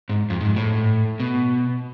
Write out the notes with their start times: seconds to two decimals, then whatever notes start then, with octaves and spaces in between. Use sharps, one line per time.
0.09 G#2
0.30 F2
0.41 G#2
0.56 A2
1.20 B2